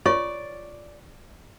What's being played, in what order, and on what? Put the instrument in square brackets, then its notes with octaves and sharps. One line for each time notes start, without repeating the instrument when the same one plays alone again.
[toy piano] F4 C#5 C#6 [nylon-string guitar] D5